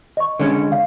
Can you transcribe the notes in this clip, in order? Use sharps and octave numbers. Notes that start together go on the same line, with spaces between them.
D#5 C#6
D3 G#3 C#4
F5